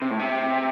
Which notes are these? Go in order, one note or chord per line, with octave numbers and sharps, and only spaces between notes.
C3
A2
C3